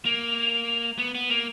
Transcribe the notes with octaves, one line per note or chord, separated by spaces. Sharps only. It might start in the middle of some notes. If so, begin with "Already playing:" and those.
A#3
B3
B3
A#3